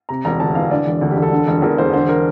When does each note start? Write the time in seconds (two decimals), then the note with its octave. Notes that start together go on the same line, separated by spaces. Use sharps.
0.09 C3 A#5
0.25 E1 A#5
0.40 D2 A5
0.55 E3 F5
0.71 D3 D5
0.87 E1
1.01 D2 A4
1.11 G4
1.17 E1
1.22 A4
1.31 D3
1.48 E1
1.62 E2 A#4
1.78 E1 C5
1.93 D3 C5
2.09 A#4